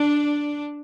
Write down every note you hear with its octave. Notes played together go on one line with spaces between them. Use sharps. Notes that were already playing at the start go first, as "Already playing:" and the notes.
Already playing: D4